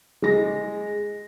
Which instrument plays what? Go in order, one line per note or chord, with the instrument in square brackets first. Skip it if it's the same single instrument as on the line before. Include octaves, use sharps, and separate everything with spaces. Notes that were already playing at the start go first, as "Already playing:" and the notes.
[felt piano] G#3 A#6